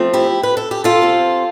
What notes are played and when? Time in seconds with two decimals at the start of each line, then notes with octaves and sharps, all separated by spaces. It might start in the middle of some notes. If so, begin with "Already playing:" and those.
Already playing: F3 A3 C4
0.13 E4 G4
0.43 B4
0.57 A4
0.71 G4
0.84 F4 A4
1.02 C3 F3 C4